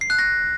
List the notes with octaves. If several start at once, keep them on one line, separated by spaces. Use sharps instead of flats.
C7
F#6
A#6